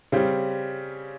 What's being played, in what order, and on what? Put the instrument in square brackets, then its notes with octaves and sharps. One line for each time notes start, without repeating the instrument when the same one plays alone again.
[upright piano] C#3 G3 C4